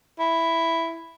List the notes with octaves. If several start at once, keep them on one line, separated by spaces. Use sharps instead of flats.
E4